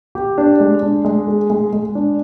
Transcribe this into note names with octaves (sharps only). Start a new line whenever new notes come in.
G4
D4
G#3
D4
G#3
G#4
G#3
G#3
D4